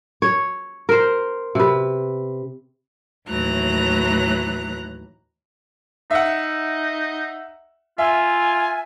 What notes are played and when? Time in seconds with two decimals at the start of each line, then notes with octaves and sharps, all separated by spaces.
0.22 C#5
0.89 A#4 C5
1.55 C3 B4
3.27 D#2 A2 E3 F#3 A#5 F#6
6.11 D#4 E5 F#5
7.98 F4 E5 G#5